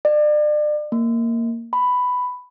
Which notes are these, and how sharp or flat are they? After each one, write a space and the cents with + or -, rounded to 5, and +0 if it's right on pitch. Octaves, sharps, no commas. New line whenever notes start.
D5 +35
A#3 -15
B5 +10